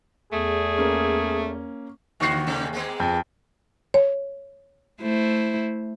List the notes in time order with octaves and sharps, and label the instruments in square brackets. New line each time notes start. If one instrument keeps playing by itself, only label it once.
[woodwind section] E2 [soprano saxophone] A3 [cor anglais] G#4
[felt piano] A#3 C#4
[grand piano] D#2 C#6 C7 [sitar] D3 F4 F#4
[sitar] G#2 C3 A3
G#3 A#3 B3
[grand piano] F2
[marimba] C#5
[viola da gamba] A3 E4 C5